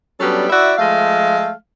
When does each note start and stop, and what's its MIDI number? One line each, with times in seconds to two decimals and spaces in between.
0.20 0.48 54
0.20 0.48 55
0.20 0.48 59
0.20 0.48 61
0.20 0.48 62
0.20 0.48 69
0.49 0.73 64
0.49 0.73 66
0.49 0.73 74
0.49 0.73 76
0.78 1.52 53
0.78 1.52 56
0.78 1.52 57
0.78 1.52 77